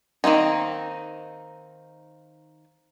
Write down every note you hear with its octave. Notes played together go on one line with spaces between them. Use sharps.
D#3 A#3 C4 D#4